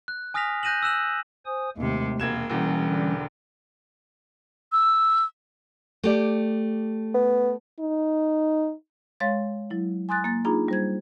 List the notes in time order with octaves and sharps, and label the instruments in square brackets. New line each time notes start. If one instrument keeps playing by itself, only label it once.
[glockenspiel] F#6
G#5 D#6 F6 A#6 B6 F7
F#6 G6 A#6 D#7 E7 F#7
E6 F#6 E7 F#7
[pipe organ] C5 G#5 D#6
[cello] D#2 C3 [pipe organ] G#3 A3
[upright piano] E1 G#6 E7 [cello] A#3
[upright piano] E1 E2 [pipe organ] E3 G3 C#4
[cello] D3
[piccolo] E6
[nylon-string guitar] A3 G4 D5
[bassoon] B3
[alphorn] D#4
[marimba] G#3 C#5 F5 C6 A6
F#3 E4
G#5 C6 D#6 F#6 A6
A#3 A6
D4 D#4 F4 G#4 A#5 B5
G3 C5 G#6